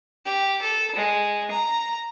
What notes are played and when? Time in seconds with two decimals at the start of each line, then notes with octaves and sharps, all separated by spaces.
0.26 G4
0.62 A4
0.95 G#3
1.51 A#5